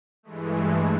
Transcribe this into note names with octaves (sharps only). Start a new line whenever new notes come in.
G2 E3 G#3 A3